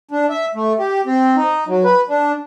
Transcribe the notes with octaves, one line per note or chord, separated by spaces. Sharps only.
D4
E5
A3
G4
C4
D#4
F#3
B4
D4